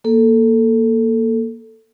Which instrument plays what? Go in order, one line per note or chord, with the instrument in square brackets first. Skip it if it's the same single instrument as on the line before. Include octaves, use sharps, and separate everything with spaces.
[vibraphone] A#3 A4